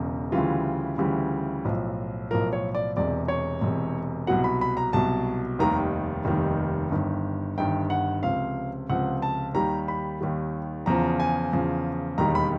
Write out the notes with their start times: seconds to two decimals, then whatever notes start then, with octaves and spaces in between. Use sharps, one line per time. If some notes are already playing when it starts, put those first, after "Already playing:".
Already playing: E1 E2 C#3
0.32 D2 C#3 E3 G3 F4
0.98 D2 C#3 E3 G3
1.65 B1 A2 F3
2.31 B1 A2 F3 A#4
2.53 C#5
2.75 D5
2.96 E1 E2 C3 D5
3.28 C#5
3.61 E1 E2 C3
4.27 C2 B2 F#3 F#5
4.44 B5
4.61 B5
4.77 A#5
4.93 C2 B2 F#3 A5
5.59 F1 D#2 D#3 G3 A#5
6.25 F1 D#2 D#3 G3
6.91 G1 G2 D#3
7.58 G1 G2 D#3 G5
7.90 F#5
8.23 C#2 C3 F3 F5
8.89 C#2 C3 F3 F#5
9.22 A5
9.54 D#2 D#3 G3 A#5
9.88 B5
10.21 D#2 D#3 G3
10.86 E2 C#3 F3 A#5
11.20 G#5
11.53 E2 C#3 F3
12.18 E1 D#2 D#3 G3 A#5
12.35 B5